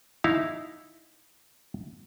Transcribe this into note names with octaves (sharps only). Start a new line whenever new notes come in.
D#4 E4 F5